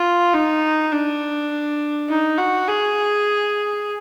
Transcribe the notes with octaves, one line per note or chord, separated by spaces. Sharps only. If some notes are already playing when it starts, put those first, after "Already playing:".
Already playing: F4
D#4
D4
D#4
F#4
G#4